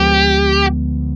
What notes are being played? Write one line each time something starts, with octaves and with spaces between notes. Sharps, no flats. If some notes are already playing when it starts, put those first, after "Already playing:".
Already playing: D2 D3 F3 G#3 B3 G4